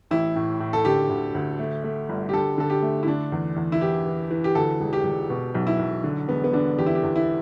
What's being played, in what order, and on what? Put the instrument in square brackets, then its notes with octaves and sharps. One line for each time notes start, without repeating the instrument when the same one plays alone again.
[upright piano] A1 [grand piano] E4
[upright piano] A2
A2
[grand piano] A4
[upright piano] D3 [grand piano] G4
[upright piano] D2
D2
A3
A3
G1
[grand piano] G4
[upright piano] D3 [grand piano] A4
[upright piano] D3 [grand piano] A4
[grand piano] G4
[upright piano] A3
[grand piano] E4
[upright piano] D3 [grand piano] D4
[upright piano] E2
E2
[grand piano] E4
[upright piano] E3 [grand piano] G4
[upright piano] E3
E3
[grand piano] G4
[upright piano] D2 [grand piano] A4
[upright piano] E1
[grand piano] G4
[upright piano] E1
B2
B1
[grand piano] E4
[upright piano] B1
D3
[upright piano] E1 [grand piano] B3
[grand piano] B3
[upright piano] D3 [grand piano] D4
[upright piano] E2 [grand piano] G4
[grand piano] E4
G4
[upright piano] E2
[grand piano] E4